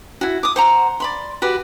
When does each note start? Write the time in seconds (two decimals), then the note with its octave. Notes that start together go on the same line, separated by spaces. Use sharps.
0.21 E4 F#4
0.43 D6 D#6
0.56 C5 F#5 A#5
1.00 D5 B5 C6
1.42 F#4 G4 B4